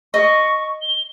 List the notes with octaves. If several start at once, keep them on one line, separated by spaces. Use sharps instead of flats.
D#5 C#6
G7